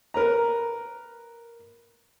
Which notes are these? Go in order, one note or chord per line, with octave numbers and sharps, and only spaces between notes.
A#4 B4 A#5